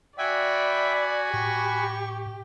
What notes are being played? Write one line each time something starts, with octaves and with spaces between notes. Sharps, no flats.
F#4 D5 E5 G5 G#5 B5
A2 G4 C#6